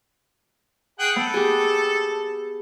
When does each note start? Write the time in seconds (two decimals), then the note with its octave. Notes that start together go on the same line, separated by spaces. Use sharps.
0.99 G#4 F#5 G5
1.16 B3 A4
1.34 G4 G#4